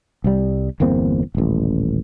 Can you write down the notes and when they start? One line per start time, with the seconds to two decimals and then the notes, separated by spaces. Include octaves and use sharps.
0.24 C2 G3
0.80 G1 E2 A#3 C4
1.35 D#1 A1